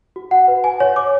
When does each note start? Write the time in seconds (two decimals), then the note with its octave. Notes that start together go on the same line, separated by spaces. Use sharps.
0.16 F#4
0.31 F#5
0.48 B4
0.64 G#5
0.80 C#5
0.96 D6